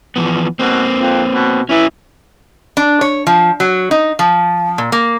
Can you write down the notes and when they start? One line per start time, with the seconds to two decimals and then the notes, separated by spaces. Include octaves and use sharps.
0.16 E3 F3 B3
0.59 B2 A#3 C4
0.99 F2
1.33 B2
1.69 E3 C#4 E4
2.77 D4
3.01 C#5
3.27 F3
3.60 F#3
3.91 D#4
4.19 F3
4.78 A#2
4.92 A#3